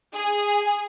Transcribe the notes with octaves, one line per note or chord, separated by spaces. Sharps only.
G#4